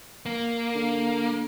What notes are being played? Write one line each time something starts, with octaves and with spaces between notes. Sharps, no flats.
A#3
D3